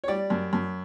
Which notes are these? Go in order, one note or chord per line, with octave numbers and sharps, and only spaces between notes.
C#5
G3 D5
F#2
F#2